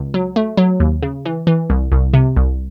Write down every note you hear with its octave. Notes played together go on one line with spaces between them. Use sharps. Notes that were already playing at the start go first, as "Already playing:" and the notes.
Already playing: C#2
F#3
A3
F#3
D#2
C#3
E3
E3
C2
C2
C3
C2